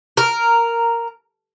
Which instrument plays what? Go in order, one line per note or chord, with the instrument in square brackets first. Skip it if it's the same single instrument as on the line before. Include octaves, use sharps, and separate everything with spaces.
[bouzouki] A#4